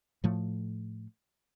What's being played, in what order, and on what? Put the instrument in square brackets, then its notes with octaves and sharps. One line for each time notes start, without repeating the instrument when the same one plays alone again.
[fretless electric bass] A2 F3 A3